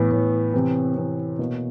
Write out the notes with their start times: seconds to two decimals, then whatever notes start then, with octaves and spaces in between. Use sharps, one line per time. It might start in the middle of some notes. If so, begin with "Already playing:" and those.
Already playing: A2 E3 B3
0.11 A2 E3
0.54 C3 E3 C4
0.97 C3 E3
1.39 B2 A#3